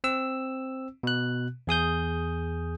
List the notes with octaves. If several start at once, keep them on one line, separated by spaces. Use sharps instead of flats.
C4 E6
B2 F#6
E2 G#4 D#6 G6